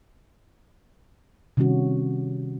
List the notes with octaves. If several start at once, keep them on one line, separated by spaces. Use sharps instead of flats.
C3 D#3 G3 C#4 F#4